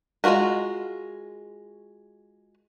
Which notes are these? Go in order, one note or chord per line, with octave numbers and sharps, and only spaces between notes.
G#3 A#3 F4 F#4 A#4